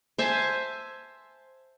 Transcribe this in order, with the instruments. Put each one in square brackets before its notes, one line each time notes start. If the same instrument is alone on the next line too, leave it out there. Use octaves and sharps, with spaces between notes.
[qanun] C5 E5 G#5 A5